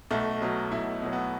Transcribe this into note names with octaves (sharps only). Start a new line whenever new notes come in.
B1 A3
B2 F#3
B1 E4
B2 F#3
B3